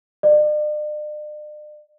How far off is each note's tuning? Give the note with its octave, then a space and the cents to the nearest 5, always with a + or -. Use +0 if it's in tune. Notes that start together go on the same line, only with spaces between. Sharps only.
D5 +45